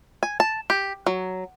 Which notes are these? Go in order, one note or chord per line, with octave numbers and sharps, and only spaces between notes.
G#5
A5
G4
F#3